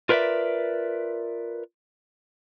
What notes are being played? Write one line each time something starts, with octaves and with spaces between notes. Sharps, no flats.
F4 A#4 B4 C#5 D5 E5